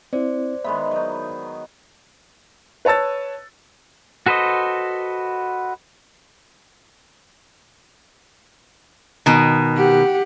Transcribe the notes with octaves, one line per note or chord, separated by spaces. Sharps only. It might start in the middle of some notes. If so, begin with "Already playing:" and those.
C4 E4 C5 D5
D#3 G#3 B3 E5 B5
F#3 D#4
B4 C#5 A5 E6 A6
F#4 A4 B4 C5 D#5
B2 D#3
G4 F#5